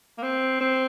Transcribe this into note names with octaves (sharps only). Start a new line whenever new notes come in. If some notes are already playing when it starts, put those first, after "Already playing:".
A#3
C4
C4